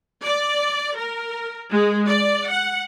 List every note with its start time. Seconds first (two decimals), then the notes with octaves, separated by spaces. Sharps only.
0.23 D5
0.96 A#4
1.70 G#3
2.07 D5
2.50 F#5